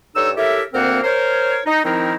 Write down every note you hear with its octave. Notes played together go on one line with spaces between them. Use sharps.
G2 D#4 A4 C#5 E6
E4 G4 A4 A#4 C#5 E5
D2 A#3 C4 A#4 C5 F#5
A#4 C5 C#5
D#4
D#3 F3 C4 D#4 E4 A#4